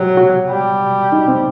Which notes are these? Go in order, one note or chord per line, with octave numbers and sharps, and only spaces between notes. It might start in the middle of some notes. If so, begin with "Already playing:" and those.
Already playing: F#3 G4
F#4
G3
D#4
C4